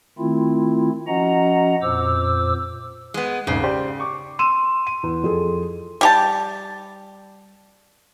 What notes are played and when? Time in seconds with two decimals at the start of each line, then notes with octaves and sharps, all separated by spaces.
0.19 D#3 A3 C4 E4 F4
1.07 F3 C#4 F#4 D#5 F#5 A#5
1.82 F2 A#2 C5 D6 E6
3.14 G#3 B3
3.47 D#1 G#1 C#3 C7
3.63 G4 C5 D5
4.00 C#6 D6
4.39 C6 E6 D#7 E7
4.87 D#7
5.03 E2
5.24 F2 G#4 A4
6.01 G3 G4 A5